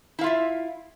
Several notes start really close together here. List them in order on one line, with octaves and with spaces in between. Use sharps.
E4 F5 F4 E5